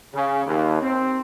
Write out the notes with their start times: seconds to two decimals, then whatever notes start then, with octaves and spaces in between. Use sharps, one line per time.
0.14 C#3
0.46 D#2
0.81 C4